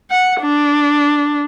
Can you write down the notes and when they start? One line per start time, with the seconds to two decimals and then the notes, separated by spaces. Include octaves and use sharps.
0.11 F#5
0.41 D4